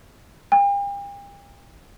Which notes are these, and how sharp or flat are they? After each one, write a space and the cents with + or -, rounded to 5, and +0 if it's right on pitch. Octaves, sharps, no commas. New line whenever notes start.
G5 +40